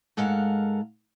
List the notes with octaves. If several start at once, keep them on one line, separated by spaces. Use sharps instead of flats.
G#2 G#3 A4 A#4 F5 F#5